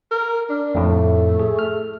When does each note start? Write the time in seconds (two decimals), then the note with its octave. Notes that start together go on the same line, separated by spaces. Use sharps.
0.11 A#4
0.49 D4
0.75 F2 A2 A3
1.40 G#4
1.59 F6